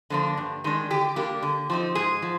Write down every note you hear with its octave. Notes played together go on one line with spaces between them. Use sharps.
D3 F3 A#3 D4
G2
D#3 G#3 D4
D3 G4
G3 A#3 D4 G4
D3
F3 C4 D#4
G#2 G#4
F3